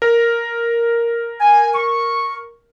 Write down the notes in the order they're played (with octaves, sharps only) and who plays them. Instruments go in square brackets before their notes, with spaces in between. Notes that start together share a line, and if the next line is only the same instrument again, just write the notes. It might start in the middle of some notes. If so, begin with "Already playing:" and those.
[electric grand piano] A#4
[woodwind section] G#5
C#6